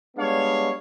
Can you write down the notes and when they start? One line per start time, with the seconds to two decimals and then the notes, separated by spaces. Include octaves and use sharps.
0.17 G3 G#3 B3 D4 C#5 F5